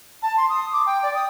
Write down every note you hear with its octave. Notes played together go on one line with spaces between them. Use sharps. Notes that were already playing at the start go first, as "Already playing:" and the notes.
A5
C6
D#6
D6
G5
D5
D#6